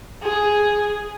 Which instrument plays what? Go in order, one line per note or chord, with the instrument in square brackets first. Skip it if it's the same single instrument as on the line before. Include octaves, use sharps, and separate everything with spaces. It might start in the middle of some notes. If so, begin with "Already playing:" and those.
[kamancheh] G#4